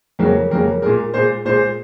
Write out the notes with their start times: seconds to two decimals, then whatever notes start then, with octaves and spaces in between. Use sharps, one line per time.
0.19 F2 C#3 F#3 A#3 A#4
0.51 F2 C#3 F#3 A#3 A#4
0.82 A#2 G#3 A#4
1.14 A#2 G#3 C5
1.45 A#2 G#3 C5